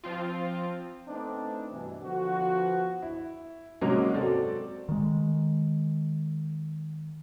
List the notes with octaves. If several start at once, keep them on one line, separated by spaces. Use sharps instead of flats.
F3 C4 F4
A3 B3 C4 D4 D#4
G2 B2 E3
D3 F3 B3 F#4
E4
G#2 C3 F#3 G#3 A#3 C#4
C4 F#4 A4 D5
D#3 G#3